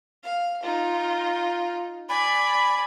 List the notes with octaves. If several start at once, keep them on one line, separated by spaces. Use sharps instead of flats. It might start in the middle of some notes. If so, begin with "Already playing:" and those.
F5
D#4 F4
D5 G#5 B5